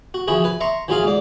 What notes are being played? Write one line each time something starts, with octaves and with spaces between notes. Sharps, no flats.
F#4
E3 F3 E4 F#4 G#4
B4 G#5
E5 A#5 C6 C#6
E3 F#3 F4 G#4 F5
G#2 D5